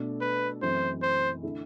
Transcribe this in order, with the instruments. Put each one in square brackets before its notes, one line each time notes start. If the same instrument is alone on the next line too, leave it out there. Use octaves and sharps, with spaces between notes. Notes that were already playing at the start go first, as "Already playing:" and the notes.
Already playing: [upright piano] B2 A3 D4 A4
[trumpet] B4
[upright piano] F#2 E3 A3 C4 E4 [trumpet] C5
[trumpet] C5
[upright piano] D3 A3 E4 A4